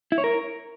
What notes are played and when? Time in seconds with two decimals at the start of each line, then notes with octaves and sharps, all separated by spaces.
0.12 E4
0.18 C#5
0.24 A#4